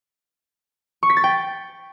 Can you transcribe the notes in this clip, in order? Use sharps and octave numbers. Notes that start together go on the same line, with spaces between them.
C#6
B6
A6
G5